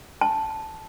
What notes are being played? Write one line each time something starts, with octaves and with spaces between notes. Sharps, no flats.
A5